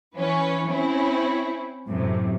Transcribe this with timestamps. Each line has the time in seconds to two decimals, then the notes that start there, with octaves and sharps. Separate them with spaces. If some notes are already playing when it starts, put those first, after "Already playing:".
0.16 E3 C#4 B4
0.70 C4 C#4 E4
1.87 F#2 A2 C3